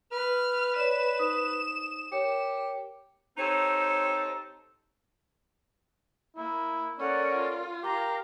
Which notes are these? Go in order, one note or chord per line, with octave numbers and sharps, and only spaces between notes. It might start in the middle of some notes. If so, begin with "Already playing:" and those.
B4 F6
C#5 D5 E7
D#4 C5 D#6
G4 A#4 C#5 C#7
C4 D#4 G4 A4 C5 C#5
A#3 E4
C#4 A4 A#4 D5 F#5
F4
G4 A#4 F5 A#5